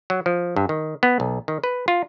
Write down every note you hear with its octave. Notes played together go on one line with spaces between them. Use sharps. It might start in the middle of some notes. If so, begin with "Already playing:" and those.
F#3
F3
G2
D#3
B3
B1
D#3
B4
F4